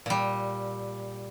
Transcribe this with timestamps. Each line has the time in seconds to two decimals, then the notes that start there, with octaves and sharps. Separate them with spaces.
0.06 A#2 G3